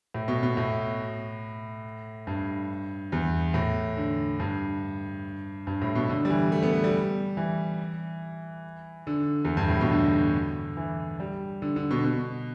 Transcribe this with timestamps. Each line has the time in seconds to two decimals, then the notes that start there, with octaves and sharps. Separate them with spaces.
0.14 A2
0.28 B2
0.43 B2
0.57 A2
2.27 G2
3.12 E2
3.54 A2
3.97 D3
4.40 G2
5.67 G2
5.82 A2
5.95 B2
6.09 D3
6.25 G3
6.30 E3
6.52 A3
6.63 B3
6.73 A3
6.84 G3
7.37 E3
9.07 D3
9.45 E2
9.57 G2
9.68 A2
9.81 B2
9.92 D3
10.77 E3
11.20 G3
11.62 D3
11.76 D3
11.91 B2
12.05 B2